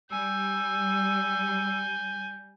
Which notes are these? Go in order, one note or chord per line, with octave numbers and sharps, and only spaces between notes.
G3 G#5 E6 G6